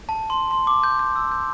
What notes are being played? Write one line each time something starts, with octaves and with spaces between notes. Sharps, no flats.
A5
C6
C6
D6
G6
G6
E6
G6